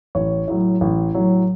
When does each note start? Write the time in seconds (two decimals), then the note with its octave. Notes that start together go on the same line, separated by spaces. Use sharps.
0.15 A1 C#5
0.48 A2 F#3
0.81 A1
1.15 A2 F#3